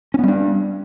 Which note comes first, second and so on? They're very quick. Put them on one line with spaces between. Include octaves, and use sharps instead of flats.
C#4 B3 G3 D4